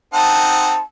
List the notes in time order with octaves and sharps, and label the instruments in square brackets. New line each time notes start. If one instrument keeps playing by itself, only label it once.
[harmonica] C4 D#4 F#5 [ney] A5